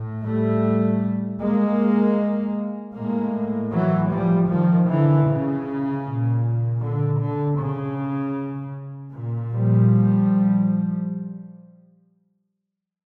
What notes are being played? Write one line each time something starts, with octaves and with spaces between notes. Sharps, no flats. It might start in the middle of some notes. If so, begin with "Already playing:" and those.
Already playing: A2
G3 A3
G#3 A#3
A2 G#3 A#3
E3 F#3
F3 G3
D#3 F3
D3 E3
C#3
A#2
D3
D3
C#3
A#2
F3 G3